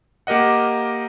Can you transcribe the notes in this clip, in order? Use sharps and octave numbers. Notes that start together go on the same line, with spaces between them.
A#3 G4 A#4 D#5 F#5